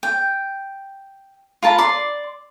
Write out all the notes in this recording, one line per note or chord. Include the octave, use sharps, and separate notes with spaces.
G5
F4 A#4 A5 B5
D5 C6